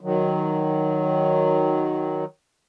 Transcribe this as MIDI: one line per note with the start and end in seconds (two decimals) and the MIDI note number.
0.01 2.24 51
0.01 2.24 54